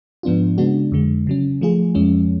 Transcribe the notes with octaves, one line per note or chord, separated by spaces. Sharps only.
G#2 F3 B3 D4 F4
C#3 G#3 B3 D4 F#4
F2 D3 G#3
C#3 F#3 C#4
F3 A3 F4 G#4
F2 F3 G#3 C#4